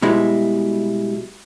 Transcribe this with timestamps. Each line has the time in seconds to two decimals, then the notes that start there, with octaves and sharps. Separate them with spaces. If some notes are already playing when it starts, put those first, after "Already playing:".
0.02 B2 G3 G#3 E4